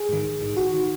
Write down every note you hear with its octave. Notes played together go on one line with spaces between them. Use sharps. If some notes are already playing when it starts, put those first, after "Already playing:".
Already playing: G#4
G#2 D#3
A#1
G#2 D#3
A#1 F#4
D#3